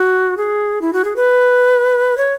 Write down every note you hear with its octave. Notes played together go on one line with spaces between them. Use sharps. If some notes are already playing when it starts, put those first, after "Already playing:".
Already playing: F#4
G#4
E4
F#4
G#4
B4
C#5